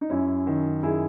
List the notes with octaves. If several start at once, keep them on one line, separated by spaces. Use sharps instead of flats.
D#4
F#2 C#4 E4
D#3
F#2 E4 G#4